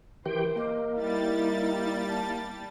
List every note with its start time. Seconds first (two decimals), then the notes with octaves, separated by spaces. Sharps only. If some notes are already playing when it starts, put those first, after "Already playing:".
0.26 E3 G4 A#4 C5 G5
0.56 A#3 A#4 D#5 D6
0.94 G3 D#4 E4 A6
2.09 A5